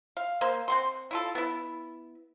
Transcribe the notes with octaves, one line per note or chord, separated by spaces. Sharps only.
F5
A#3 C5
C4 F#5 C6
E4 F4 A4
B3 E4